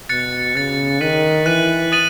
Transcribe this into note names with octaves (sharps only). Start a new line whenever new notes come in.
B2 F#6 A6 C#7
C#3 F#6 A6 C#7
D#3 F#6 B6 D#7 F#7
E3 F#6 B6 D#7 F#7
D#6 A6 D#7 F#7